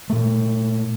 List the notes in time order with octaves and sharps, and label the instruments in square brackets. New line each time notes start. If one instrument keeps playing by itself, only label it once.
[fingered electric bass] A#2 A3